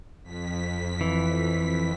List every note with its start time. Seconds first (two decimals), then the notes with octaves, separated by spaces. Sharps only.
0.23 F2 B6
1.01 E3